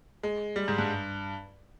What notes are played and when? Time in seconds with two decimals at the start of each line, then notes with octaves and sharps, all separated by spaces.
0.23 G#3
0.56 G3
0.68 G#2
0.78 G2